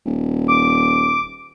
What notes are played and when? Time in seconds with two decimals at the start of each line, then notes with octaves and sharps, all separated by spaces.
0.06 D#1
0.48 D6